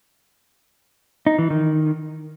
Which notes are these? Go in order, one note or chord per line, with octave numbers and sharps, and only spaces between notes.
D#4
E3
D#3